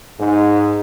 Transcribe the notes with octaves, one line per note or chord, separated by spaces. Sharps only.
G#2